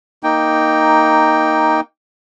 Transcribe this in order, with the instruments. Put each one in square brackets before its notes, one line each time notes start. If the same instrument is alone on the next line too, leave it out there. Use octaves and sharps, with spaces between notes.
[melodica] A#3 D#4 G5